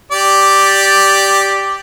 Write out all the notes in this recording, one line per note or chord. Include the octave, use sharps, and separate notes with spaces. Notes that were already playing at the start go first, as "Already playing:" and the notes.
G4 D5